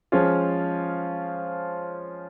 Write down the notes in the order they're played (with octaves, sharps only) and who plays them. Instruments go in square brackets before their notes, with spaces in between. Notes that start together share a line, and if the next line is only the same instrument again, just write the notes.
[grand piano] F3 G#3 C#4 F4